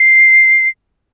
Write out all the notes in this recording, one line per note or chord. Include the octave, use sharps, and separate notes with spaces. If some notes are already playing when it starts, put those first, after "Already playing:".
Already playing: C7